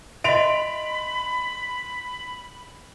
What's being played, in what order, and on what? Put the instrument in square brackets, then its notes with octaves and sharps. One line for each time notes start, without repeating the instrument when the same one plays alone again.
[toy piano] D#5 E5 [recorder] B5 [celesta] C6 [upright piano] D7 F7